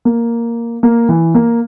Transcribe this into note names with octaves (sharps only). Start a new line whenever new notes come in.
A#3
A#3
E3
A#3